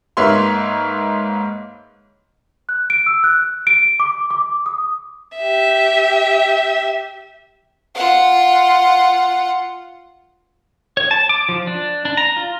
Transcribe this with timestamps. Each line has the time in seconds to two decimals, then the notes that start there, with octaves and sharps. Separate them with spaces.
0.17 G#2 A#3 B4 C#5 E5 C6
2.69 F#6
2.90 D7
3.06 E6
3.24 F#6
3.67 D7
4.00 D6
4.30 D6
4.66 D#6
5.37 G4 E5
7.95 F4 F#5
10.97 C#5
11.11 A5
11.29 D6
11.49 F3
11.67 D4
12.05 D4
12.17 A#5
12.37 F4